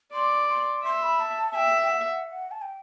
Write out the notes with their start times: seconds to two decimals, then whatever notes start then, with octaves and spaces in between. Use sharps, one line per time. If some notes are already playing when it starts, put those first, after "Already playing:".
0.13 D5 C6
0.49 C6
0.84 E5 C6
1.02 B5
1.20 A5
1.55 E5 G5
1.91 F#5
2.51 A5
2.62 G5